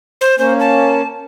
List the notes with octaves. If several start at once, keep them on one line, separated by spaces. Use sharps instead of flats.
C5
A#3 C#4 C5
A5